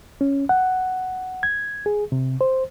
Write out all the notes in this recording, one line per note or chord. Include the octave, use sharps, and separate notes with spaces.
C#4
F#5
G#6
G#4
C3
C5